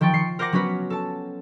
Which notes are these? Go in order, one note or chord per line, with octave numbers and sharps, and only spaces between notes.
D#3 F3 G5 C#6 A6
F3 C7 C#7
A#4 C5 F#5 D6 A#6
F#3 B3 C#4 F#4 B4
A4 A5